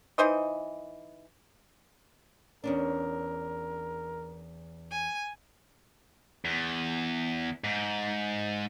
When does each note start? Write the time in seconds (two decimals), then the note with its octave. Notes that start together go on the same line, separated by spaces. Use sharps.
0.18 E3 D#4 C5 D#5
2.64 E2 C#4 D4 A#4
4.90 G#5
6.45 E2
7.64 G#2